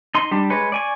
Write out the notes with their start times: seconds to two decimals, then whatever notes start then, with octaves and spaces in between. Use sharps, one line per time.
0.15 D#4 C6
0.31 G3 D4
0.50 G#3 B4 C#5
0.72 D5 G#5 C#6